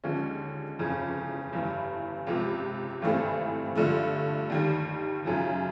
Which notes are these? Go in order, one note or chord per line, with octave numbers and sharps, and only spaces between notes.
D#2 D3 F3 G#3 C#4
G1 F2 C#3 E3
G1 G2 E3
C#2 C3 F3
G#1 G2 E3 A3 C4
G2 D3 F3 A3
D#2 D#3 G3
F#2 C#3 F3